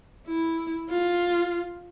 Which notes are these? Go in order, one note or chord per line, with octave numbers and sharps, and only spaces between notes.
E4
F4